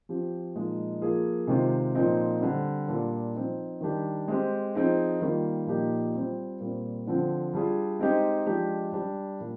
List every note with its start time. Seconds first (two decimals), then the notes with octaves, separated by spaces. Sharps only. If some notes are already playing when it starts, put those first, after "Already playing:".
0.09 F3 C4 G4
0.55 A#2 F3 G#3 D#4
1.01 F3 A#3 F4 G#4
1.47 C3 D#3 G#3 C4 F4
1.95 A#2 F3 C4 D#4
2.41 D3 G3 C4
2.88 A#2 G3 D4 F4
3.35 F3 C4 D#4
3.81 D#3 G3 D4 G4
4.28 G#3 C4 G4
4.74 F3 C4 D#4 G#4
5.21 D#3 G3 A#3 F4
5.67 A#2 F3 A#3 D#4 G4
6.14 G3 C4 F4
6.60 A#2 G3 C4
7.07 D3 F3 C4
7.54 G3 D4 F4 G#4
7.99 G#3 C4 D#4 G4
8.46 F3 G#3 D4 G4
8.93 G3 D4 G4
9.40 A#2 G3